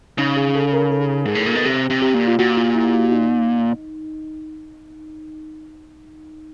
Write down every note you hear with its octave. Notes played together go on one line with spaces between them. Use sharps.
C#3 D#4
G#4
A4
A#4
A4
G#2 G#4
A2
A#2
B2
C3 G4
C3
G4
A#2
F4
A#2 F#4
F4
E4
D#4